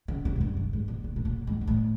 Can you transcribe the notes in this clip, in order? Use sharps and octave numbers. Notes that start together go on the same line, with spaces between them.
C#3
C3
G#2
G2
G2
G#2
A#2
B2
A2
A#2
G#2
G#2
A2